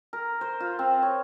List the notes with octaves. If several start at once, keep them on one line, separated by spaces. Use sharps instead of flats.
A#4
C5
F4
C4
C#5